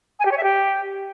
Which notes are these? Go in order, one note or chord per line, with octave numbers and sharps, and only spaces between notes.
G#5
G4
C#5
E5
G4